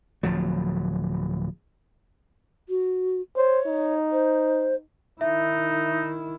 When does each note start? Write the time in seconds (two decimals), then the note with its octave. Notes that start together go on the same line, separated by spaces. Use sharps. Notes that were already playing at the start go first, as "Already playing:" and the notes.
0.23 D1 F3 F#3
2.68 F#4
3.36 C5 C#5
3.66 D#4
4.11 C5
5.21 D#3 D#4 E4 E5